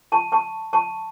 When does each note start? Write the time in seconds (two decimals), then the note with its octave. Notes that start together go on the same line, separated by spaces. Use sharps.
0.12 A5 C#6
0.32 A5 C#6
0.73 A5 C#6